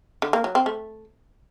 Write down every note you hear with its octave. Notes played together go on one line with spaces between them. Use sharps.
D3
A#3
F#3
C4
A3